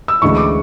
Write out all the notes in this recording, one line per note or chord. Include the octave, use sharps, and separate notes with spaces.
E6
D2 C#3 E3 G#3 C#6
D6